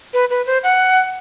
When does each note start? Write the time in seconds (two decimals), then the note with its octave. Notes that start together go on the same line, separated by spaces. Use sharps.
0.14 B4
0.30 B4
0.46 C5
0.64 F#5